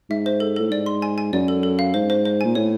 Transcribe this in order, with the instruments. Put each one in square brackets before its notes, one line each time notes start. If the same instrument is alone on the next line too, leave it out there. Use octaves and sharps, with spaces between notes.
[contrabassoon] G#2 [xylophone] E5
[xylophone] C5
A4
[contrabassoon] A2 [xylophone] A4
[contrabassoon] G#2 [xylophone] D5
[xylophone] C6
G#5
G#5
[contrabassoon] F#2 [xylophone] D5
[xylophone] A4
A4
F5
[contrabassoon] G#2 [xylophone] C5
[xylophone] C5
C5
[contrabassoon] A#2 [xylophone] G#5
[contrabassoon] A2 [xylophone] C#5